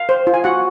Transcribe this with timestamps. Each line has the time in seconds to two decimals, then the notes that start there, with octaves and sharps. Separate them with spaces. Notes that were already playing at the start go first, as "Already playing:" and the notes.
Already playing: F5
0.09 C5
0.27 F4
0.34 G#5
0.44 F#4 F#5